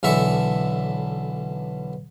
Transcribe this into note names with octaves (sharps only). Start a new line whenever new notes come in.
B1 D3 E3 A4 E5 C#6